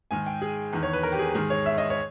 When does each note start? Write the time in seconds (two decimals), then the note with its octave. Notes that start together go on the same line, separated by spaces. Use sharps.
0.11 G#2 D#3 G#5
0.26 G5
0.42 G#4
0.73 E2 D#3
0.83 C#5
0.93 B4
1.03 A#4
1.12 G4
1.19 G#4
1.35 G#2 D#3 G#4
1.50 C#5
1.66 E5
1.78 D#5
1.90 C#5